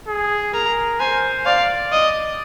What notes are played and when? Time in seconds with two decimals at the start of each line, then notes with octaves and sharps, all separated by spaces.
0.08 G#4
0.54 A#4 A#5
1.00 C5 G#5
1.46 D5 F5
1.92 D#5